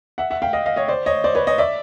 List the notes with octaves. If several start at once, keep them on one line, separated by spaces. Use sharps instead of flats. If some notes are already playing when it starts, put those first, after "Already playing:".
E5 F#5
E5 F#5
F5 G5
D#5 F5
D#5 F5
C#5 D#5
C5 D5
C#5 D#5
C5 D5
B4 C#5
C#5 D#5
D5 E5